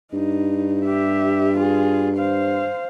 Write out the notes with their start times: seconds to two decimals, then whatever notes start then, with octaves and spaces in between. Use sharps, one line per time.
0.13 G2 D#4
0.85 G4 E5
1.57 F4 G#4
2.17 C5 F5